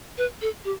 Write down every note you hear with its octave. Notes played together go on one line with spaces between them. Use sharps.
B4
A4
G4